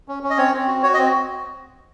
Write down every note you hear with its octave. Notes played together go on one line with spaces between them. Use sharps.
C#4
C#4
D#5
C4 C#5
C4
F#4
F#4 C#5
D#5
C4